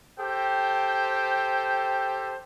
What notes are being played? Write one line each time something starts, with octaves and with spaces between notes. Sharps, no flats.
G4 A4 C5 G5